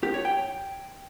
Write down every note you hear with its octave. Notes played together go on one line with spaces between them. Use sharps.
G4
C#5
G5